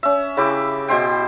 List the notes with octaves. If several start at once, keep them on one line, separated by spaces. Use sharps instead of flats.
C#4 E5
C#3 E4 G4 D6
B2 G4 C5 G5